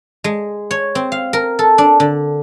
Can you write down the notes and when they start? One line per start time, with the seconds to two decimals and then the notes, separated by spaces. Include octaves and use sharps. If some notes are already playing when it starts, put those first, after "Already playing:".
0.24 G#3
0.71 C#5
0.95 C4
1.12 F5
1.33 A#4
1.59 A4
1.78 D4
2.00 D3